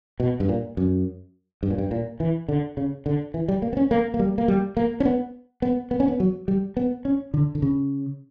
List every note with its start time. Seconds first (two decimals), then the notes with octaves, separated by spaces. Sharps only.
0.20 B2
0.40 G2
0.49 A#2
0.77 F#2
1.63 G2
1.70 A#2
1.78 G2
1.91 A#2
2.20 E3
2.49 D3
2.77 C#3
3.06 D3
3.34 E3
3.48 G3
3.62 A#3
3.73 B3
3.77 C#4
3.91 A#3
4.14 A#3
4.19 G3
4.38 A#3
4.48 G3
4.77 A#3
5.00 C#4
5.05 B3
5.62 B3
5.91 B3
6.00 C#4
6.08 B3
6.20 F#3
6.48 G3
6.77 B3
7.05 C#4
7.34 D3
7.55 D3
7.62 C#3